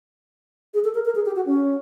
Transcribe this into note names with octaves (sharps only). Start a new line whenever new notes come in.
G#4
A4
A#4
A#4
G#4
G4
F#4
C#4